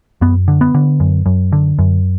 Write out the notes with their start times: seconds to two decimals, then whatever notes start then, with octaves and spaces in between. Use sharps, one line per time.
0.21 F#2 B3
0.48 D3
0.61 B3
0.74 D3
1.00 F#2
1.26 F#2
1.52 D3
1.79 F#2